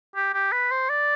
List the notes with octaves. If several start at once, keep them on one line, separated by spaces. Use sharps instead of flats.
G4
G4
B4
C5
D5